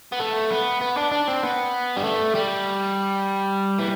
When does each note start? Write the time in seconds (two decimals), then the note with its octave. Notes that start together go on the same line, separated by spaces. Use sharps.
0.12 B3
0.20 A3
0.51 B3
0.81 B3
0.97 D4
1.12 D4
1.28 C4
1.43 B3
1.97 G3
2.04 A3
2.35 G3
3.79 E3